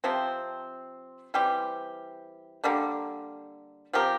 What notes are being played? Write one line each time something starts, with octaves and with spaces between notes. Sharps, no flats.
C3 F3 C4
E3 G3 C4 G4
D3 G3 A#3
F3 C4 G4 A#4